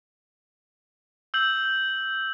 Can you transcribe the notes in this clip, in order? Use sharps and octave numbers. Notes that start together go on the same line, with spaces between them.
E6 G6 F#7